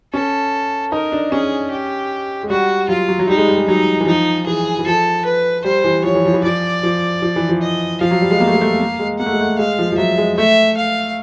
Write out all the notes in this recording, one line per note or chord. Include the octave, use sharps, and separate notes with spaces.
C#4 A4
D#4 A#4
D4
C#4 G#4
G4
G#3
G3 F#4
F#3 F4
F#3
F#3
G3 D#4
G#3
G3
G#3
F#3 D#4
E3
F3 D#4
E3 G#4
E3
F3 A4
B4
G3 C5
E3
F3 C#5
E3
F3
E3
F3 D5
F3
F3
E3
F3
D#5
F3 F5
F#3
G3
G#3
A#3
A3
G#3
A3
A#3
G#3
A#3 F#5
A3
G#3
A3
G#3 F5
F3
F3
F#3 E5
G#3
A3 E5
F5